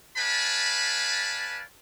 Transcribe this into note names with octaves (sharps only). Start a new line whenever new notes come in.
B4 D5 F5 G#5 A5 B5